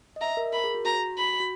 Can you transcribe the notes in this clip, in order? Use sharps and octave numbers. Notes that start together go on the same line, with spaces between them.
D#5
E5 A#5
A#4
A#4 B5
G#4
F#4
F#4 A#5
B5
F#4